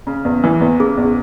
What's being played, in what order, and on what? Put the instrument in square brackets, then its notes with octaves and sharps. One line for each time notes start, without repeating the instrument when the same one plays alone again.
[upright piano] C#3
E2
E3
E2
[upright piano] C#3 [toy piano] G#4
[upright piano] E2